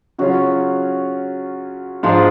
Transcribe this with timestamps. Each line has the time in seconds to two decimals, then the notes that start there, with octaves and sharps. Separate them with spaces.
0.18 C#3 F#3 C#4 F4 F#4
2.03 G#2 F3 G#3 D4 F4 G#4